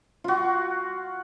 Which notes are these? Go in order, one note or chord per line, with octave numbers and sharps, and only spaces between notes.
F4 F#4